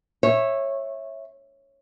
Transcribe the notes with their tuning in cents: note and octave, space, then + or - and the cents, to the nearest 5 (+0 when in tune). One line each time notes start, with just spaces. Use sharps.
C#5 -20 E5 +0